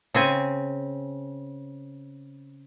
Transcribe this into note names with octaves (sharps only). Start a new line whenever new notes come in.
C#3 C4 G#5